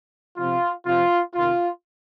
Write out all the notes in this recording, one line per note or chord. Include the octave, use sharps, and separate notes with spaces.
C3 F3 F4
C3 F3 F4
C3 D#3 F4